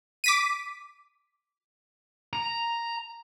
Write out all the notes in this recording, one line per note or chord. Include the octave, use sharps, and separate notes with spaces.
D6 B6 D#7
A#5